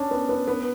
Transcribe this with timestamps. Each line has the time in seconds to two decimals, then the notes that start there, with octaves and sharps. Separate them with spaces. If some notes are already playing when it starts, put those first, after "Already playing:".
Already playing: C#4 D4
0.11 B3
0.29 B3
0.48 B3